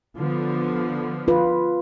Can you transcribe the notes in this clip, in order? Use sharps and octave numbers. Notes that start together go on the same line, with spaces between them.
D3 F3 B3
F4 B4